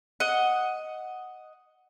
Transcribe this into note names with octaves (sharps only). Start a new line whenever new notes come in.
D#5 F#5